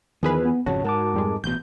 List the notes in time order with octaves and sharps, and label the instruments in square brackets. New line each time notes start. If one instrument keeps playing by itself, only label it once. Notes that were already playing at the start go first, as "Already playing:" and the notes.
[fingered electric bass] E2 [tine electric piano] D#3 [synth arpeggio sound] F3 G#4 B4
[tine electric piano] B3
[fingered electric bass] G#1 F2 C#3 [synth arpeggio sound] F#4 [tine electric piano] C#5 A5
[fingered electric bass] G#2 [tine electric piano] A#4 A5 D6
[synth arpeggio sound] F2 G3 G#3
[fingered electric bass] A1 B2 [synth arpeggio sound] G6